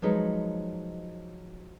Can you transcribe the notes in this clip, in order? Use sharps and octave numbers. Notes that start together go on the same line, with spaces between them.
F3 F#3 G#3 D#4 B4 C#5